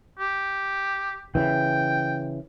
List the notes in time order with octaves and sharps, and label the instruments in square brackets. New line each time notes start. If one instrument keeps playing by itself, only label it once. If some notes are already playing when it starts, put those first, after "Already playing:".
[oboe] G4
[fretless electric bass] C#3 E3 [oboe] G5